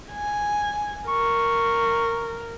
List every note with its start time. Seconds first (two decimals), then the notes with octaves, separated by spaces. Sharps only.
0.12 G#5
1.08 A#4 C#6